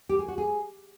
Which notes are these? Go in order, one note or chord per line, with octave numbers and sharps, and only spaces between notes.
G4
G#4
F#4
G#4